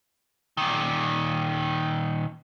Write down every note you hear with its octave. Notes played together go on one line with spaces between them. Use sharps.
A#2 D#3